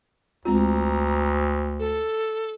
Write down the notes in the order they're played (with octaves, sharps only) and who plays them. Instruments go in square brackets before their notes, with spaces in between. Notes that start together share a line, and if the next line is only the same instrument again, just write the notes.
[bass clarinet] D2 [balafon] G#3 C4 F4 [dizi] A#5
[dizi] A4